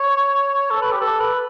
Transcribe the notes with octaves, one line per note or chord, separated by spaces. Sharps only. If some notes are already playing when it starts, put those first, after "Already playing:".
Already playing: C#5
A4
B4
G4
A4
B4